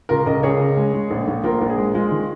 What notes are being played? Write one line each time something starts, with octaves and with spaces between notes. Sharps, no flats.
C#2 F4 A#4
C#2 A#4 D#5
C#2 G#4 C#5
C#3
G#3
G#3
A#1
A#1
A#1 F4 A#4
A#1
G#4
G#3
G#3 F4
D#3